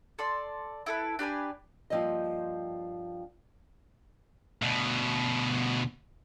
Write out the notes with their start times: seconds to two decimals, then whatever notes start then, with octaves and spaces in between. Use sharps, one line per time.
0.19 A4 D5 C6
0.86 E4 A4 B4
1.19 D4 G4 B4 G#5
1.90 G2 B2 F3 A#3 C4 D#5
4.62 D2 B2